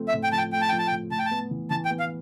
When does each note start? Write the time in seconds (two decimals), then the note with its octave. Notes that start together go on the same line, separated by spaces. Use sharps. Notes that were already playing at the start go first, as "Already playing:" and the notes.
Already playing: F3 A3 C4
0.08 E5
0.13 A2
0.24 G5
0.32 F3 A5
0.38 G5
0.53 A3 G5
0.61 A5
0.69 F3 G5
0.79 A5
0.87 G5
0.92 A2
1.11 A2 A5
1.19 G5
1.26 A5
1.31 B3
1.51 E3
1.70 E3 A5
1.85 G5
1.90 B3
2.00 F5